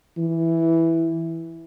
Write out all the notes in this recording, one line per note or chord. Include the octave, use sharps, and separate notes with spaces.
E3